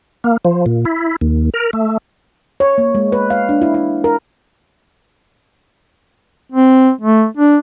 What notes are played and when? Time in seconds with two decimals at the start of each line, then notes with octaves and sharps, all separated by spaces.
0.24 A#3
0.45 F3
0.66 A#2
0.85 E4
1.21 D#2
1.54 A#4
1.73 A3
2.60 C#5
2.78 A#3
2.95 G#3
3.12 B4
3.30 F5
3.49 D4
3.62 E4
3.74 E4
4.04 A#4
6.52 C4
7.01 A3
7.37 D4